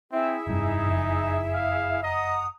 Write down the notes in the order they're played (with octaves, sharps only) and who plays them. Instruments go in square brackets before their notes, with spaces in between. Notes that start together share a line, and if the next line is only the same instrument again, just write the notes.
[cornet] C4 [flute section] E4 G#4 E5
[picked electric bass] F1 G2 [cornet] D#4
[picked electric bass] F#1 F2
[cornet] F5
[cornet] D#5 [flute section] F#5 A#5 D#6